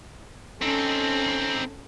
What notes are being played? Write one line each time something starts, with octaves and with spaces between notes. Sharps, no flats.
C4 C#4 D#4 A4